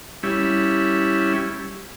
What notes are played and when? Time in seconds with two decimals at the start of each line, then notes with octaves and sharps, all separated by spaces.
0.23 G3 C#4 E4